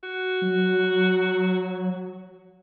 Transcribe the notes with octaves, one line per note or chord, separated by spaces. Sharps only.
F#4
F#3